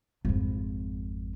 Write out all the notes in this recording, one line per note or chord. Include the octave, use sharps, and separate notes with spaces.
G#1 F2